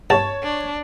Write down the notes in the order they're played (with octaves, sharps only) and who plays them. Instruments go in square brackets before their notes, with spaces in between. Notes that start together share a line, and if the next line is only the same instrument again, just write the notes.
[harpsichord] G2 [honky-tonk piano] C#5 [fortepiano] A5
[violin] D4